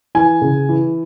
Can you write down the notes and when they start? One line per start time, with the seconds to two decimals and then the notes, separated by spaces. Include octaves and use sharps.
0.15 E3 G#5
0.42 C#3
0.69 E3